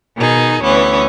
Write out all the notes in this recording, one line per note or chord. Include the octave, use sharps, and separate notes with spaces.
B2 D#3 D#4 G#4
D2 E3 B3 C#4